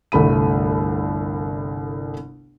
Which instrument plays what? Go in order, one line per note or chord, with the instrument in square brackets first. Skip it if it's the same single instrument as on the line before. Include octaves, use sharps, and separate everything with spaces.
[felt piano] G1 C2 A3 B5 D#7